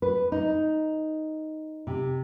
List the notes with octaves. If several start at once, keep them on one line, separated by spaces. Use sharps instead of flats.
B4
D#4
C3